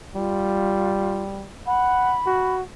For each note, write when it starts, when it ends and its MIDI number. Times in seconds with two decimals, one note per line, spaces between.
0.15 1.48 55
0.15 1.23 65
1.67 2.16 78
1.67 2.55 83
2.26 2.62 66